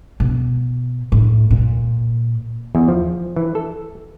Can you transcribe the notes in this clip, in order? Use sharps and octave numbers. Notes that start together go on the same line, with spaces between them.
B2
A2
A#2
E2
F3
E3
A4